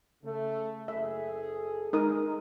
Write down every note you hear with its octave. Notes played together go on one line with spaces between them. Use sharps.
C#3 A3
F#1 G#4 A4 E5
G#3 D#4 A#4 D#6